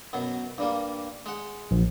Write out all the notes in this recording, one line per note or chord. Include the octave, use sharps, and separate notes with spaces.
F#2 B2 F#3
G2 G3 A#3
G#3 F#5
A#1